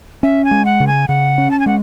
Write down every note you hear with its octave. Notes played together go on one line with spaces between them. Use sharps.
C#4 E5
G#5
G#3
F#5
C#3
G#5
C#3 F#5
C#4
A5
G#5
G#3 F#5